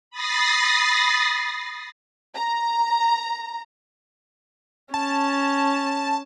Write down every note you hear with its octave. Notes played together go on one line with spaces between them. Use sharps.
B5 D#6 A6 A#6 C7
A#5
C#4 A5